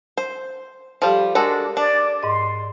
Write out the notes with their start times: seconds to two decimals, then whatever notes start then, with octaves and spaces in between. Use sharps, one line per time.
0.17 C5
1.02 F3 G3 G4 A4 F5
1.35 G#3 D4 F#4 A4 A#4
1.77 D4 D5
2.23 G#2 D#5 C6